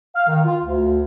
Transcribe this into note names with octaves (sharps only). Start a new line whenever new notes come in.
F5
D#3
F4
D2